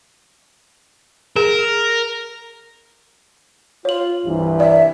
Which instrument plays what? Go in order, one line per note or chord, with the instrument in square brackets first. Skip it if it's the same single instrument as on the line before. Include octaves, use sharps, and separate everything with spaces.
[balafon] G#4 [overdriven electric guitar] A#4
[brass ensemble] F4 [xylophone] C#5 F#7
[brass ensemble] C2 G2 E3
[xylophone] D5 [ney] E5